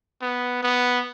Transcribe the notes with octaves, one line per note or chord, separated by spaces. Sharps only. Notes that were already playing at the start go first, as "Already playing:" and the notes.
B3
B3